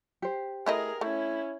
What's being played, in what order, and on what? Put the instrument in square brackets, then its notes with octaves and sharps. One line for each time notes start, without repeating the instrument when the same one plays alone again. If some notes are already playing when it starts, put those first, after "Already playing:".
[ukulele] G4 C5
[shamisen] A3 E4 D#5 [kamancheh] G#4 A#4
[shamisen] A3 [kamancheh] C#4 E4